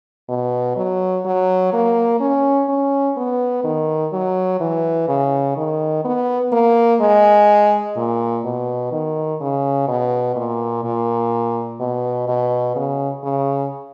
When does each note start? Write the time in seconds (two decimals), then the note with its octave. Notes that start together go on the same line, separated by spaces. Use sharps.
0.29 B2
0.77 F#3
1.26 F#3
1.73 A#3
2.21 C#4
2.69 C#4
3.17 B3
3.64 D#3
4.13 F#3
4.60 E3
5.09 C#3
5.57 D#3
6.05 B3
6.52 A#3
7.01 G#3
7.96 A#2
8.45 B2
8.92 D#3
9.41 C#3
9.88 B2
10.36 A#2
10.84 A#2
11.80 B2
12.28 B2
12.76 C#3
13.24 C#3